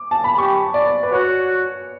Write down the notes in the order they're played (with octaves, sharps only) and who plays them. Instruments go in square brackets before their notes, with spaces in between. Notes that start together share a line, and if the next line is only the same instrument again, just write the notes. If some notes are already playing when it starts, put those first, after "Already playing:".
Already playing: [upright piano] D6
A5
B5
[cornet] G4 [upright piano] C#6
[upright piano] D5
B4
[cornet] F#4 [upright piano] C#5